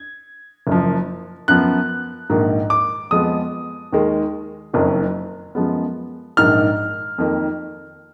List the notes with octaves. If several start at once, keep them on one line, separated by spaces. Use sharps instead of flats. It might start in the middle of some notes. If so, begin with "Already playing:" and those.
Already playing: G#6
F#1 F#2 F3
F#2 F3 B3 F#6
A#1 G#2 D#3 A#3
D6
F2 F3 G#3 B3 D#6
D#2 D#3 G#3
F#1 F2 D#3 F#3
F#2 F3 G#3 B3
A#1 G#2 D#3 F6
F2 D#3 A#3